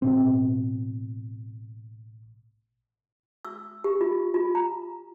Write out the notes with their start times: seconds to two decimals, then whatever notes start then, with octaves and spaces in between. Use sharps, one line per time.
0.02 A1 B2 C4
3.45 E6
3.84 G4
4.01 F4
4.34 F4
4.55 A#5